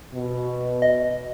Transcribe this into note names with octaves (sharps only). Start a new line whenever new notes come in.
B2
D#5